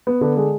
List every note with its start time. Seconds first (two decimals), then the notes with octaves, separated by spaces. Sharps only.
0.07 B3
0.21 D3
0.37 G#3